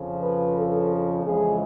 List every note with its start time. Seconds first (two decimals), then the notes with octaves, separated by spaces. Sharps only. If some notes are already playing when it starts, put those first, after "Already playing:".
Already playing: F2 C#3 F3
0.21 B4
0.56 A4
1.23 F2 C#3 E3 G#3 G#4